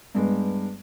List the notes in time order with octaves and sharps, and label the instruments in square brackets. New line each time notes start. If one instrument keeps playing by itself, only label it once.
[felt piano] G2 G#3 B3